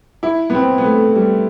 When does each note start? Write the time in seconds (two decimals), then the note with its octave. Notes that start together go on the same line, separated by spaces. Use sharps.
0.23 E4
0.50 B3
0.54 C4
0.78 B3
0.84 A3
1.15 G3